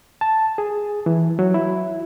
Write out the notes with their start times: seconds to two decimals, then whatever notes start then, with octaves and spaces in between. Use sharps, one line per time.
0.21 A5
0.58 G#4
1.06 E3
1.39 F#3
1.54 E4